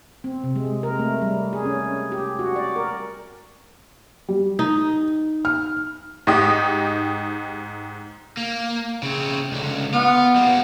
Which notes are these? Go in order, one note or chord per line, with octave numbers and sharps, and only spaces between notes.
C4
C3
G#3
A#4
A3
G3
G#4
C#4
G4
F#4
D5
A#4
G3
D#4
F6
G#2 D#4 G4 D#6
A#3
C#3 C4
C#2 D3
B3 F4
G3 A#3